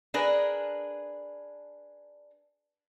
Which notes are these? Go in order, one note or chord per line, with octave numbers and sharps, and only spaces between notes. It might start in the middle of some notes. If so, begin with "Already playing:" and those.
D4 G#4 A#4 B4